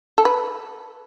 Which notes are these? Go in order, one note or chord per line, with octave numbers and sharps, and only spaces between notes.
A4
B4